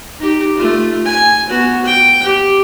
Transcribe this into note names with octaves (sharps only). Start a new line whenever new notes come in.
D#4 G4
A3 F4
G#5
B3 F#4
G5
G4